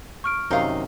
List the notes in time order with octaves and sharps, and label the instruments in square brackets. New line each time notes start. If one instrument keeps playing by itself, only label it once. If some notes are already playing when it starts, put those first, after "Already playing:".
[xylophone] C#6 F6 D7
[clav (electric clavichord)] F#2 C3 D#3 [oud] D#4 F5